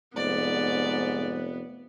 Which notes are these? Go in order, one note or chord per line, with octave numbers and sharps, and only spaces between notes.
F1 G#2 B3 D5